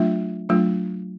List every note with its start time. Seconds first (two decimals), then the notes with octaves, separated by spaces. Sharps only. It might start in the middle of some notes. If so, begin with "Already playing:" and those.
Already playing: F#3 A3 D4 F4 E5
0.49 F#3 A3 D4 F4